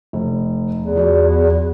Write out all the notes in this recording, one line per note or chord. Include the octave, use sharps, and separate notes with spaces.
F1
E2
F3 F#4 D5